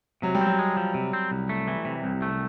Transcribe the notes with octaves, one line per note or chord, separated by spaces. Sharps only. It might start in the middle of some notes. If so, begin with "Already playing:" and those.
C3 F#3
G3
C4
F#3
G#3
F3
C3
C4
C2
A3
E3
C3
C2
A3